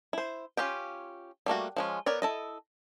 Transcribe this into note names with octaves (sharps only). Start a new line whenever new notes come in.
E4 C5
C#4 F4 G4 G5
G3 A3 A#3 F#4
F3 G#3 C#4
B3 A#4 C#5 D5
E4 A4 D#5